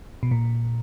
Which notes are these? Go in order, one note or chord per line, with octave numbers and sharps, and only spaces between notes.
B2
A#2